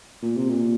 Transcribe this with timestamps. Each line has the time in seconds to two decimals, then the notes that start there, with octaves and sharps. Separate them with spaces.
0.23 A#2
0.37 C3
0.50 A#2